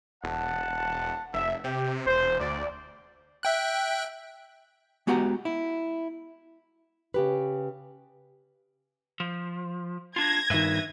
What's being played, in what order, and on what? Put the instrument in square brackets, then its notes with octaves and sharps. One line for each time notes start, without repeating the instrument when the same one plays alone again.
[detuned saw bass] E1 [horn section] F#5 A5
[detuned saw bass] F1 [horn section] E5
[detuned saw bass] C3 [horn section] G4
[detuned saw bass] E1 [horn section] C5
[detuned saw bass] D2 [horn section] D5
[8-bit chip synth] E5 G5 F#6
[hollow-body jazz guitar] G#3 B3 F#4 G4 F#5 A#5
E4
[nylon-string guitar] C#3 G4 B4
[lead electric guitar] F3
[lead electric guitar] D4 F4 [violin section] G#6 A#6
[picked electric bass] G2 D#3 [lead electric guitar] B4 E5